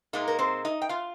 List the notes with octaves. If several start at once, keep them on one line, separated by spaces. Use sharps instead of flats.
A#2 G#3 A#3 D#4 A#4
A#4
C4 C5
D#4 D#5
G5
F4 F5